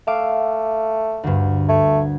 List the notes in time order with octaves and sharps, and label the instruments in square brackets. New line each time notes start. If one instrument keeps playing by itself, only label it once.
[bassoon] A3 [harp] E5 F5 D6
[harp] D2 G2
[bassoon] A3 [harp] G#6